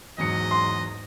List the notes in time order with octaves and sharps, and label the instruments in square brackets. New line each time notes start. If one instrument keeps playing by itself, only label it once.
[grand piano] E2 F#3 C#7 [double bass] G#2 [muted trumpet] D#5
[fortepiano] C6